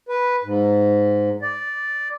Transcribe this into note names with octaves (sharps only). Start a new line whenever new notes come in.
B4
G#2
D5